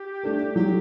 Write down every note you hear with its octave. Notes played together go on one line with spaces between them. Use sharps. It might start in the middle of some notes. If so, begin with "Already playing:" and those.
Already playing: G4
A3 D4 A4
F#3 G4